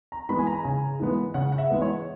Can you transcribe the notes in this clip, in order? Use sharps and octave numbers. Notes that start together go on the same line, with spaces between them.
A#5
E3 G#3 B3 B5
G#5
A#5
C#3 G#5
E3 G#3 B3
C#3 F#5
F#5
E5
E3 G#3 B3
C#5